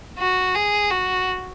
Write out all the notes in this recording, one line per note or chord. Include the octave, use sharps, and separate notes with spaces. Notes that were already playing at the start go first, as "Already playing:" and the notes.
F#4
G#4
F#4